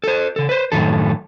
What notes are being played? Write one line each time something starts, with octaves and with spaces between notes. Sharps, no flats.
A4 C5
C#3 A4
B4 C5
F#2 A2 D#3 A4